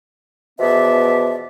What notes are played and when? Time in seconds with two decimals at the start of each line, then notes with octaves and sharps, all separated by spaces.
0.59 E2 B2 F3 B3 D5 E5